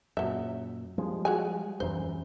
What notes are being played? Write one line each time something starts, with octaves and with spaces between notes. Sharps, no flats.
F#2 A#2 F#3 E5
F3 G3 G#3
F#4 G#4 G#5
D#1 F#2 E3 C5